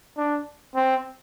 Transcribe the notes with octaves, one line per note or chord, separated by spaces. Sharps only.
D4
C4